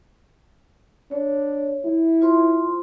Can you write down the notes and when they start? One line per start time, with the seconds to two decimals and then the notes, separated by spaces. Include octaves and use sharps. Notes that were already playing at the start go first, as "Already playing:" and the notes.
1.11 D4 C#5
1.85 E4
2.21 F4 C5 C6